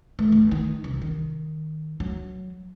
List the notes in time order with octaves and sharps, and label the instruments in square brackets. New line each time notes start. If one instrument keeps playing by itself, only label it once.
[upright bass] A3
G1
D#3
C2
D#3
F#3